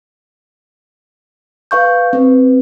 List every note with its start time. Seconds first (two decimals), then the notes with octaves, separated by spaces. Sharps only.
1.71 B4 F5 C#6 G6
2.13 C4 B4